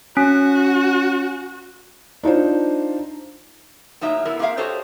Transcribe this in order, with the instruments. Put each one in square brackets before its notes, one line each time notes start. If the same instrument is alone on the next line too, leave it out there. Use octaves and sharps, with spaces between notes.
[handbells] C#4 [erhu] F#4
[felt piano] D4 D#4 F4 C5
[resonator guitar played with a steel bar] A2 F#3 A#3 D#4 E5
B3 E4 A4 A#4
A#3 C4 G#4 A#4 E5 F5
F#4 G4 A4 C5 C#5 D#5